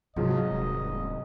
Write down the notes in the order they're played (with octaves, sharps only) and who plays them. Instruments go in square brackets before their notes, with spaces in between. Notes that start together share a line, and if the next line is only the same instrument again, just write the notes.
[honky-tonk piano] G#2 F#3 [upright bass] C3 [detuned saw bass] F3 [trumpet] D#5
[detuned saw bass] D#1